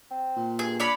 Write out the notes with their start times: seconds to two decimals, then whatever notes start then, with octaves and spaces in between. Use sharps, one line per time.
0.11 C4
0.37 A#2
0.59 G2 G#4
0.80 D4 C#5 D5 B5